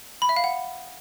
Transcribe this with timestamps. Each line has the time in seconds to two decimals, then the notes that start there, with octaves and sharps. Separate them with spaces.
0.22 B5
0.29 E5
0.36 F5
0.44 F#5